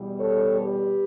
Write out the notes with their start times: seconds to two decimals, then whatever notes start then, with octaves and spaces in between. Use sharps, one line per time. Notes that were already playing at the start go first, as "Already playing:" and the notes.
Already playing: E2 B2 G3
0.19 A4 C#5
0.60 G4 B4